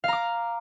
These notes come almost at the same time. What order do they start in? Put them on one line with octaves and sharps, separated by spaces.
F5 A#5 D6